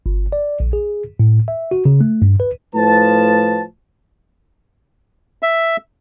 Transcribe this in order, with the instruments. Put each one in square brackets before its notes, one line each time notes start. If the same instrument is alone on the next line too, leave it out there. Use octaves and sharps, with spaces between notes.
[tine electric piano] G1
D5
A#1
G#4
A2
E5
F#4
C#3
A3
G2
B4
[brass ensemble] A2 F3 B4 A5
[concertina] E5